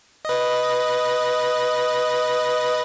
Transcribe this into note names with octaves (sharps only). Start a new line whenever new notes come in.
B4 D#5